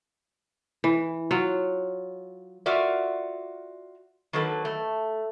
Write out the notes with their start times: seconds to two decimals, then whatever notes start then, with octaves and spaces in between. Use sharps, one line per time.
0.84 E3
1.31 F#3 F4
2.66 F4 F#4 A#4 D5 E5
4.33 D#3 F#3 A#3 A4 B4
4.65 A3